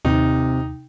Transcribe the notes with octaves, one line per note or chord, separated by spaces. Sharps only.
D#2 C3 D#4